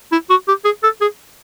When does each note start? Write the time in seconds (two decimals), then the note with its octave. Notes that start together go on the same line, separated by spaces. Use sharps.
0.12 E4
0.30 F#4
0.48 G4
0.65 G#4
0.83 A4
1.01 G#4